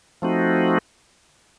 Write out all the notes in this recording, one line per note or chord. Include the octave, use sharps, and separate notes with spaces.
F3 A3 C4 D#4 F#4